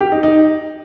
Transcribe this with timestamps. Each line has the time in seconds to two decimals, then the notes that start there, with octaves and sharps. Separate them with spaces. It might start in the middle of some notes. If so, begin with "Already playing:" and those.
0.01 G4
0.12 D#4
0.23 D#4